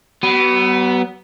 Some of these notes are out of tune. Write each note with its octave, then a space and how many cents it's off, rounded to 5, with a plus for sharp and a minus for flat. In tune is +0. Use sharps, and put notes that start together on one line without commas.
F#3 +40 B3 +0